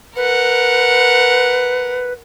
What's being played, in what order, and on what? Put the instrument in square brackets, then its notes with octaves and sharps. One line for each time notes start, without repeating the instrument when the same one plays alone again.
[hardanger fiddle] A#4 F#5 [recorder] B4